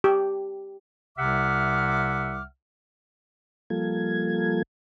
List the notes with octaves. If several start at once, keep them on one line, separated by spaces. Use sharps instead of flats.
G4
C2 C3 E5 F#5 D6 F6
F3 G3 A#3 F4 A4 G#6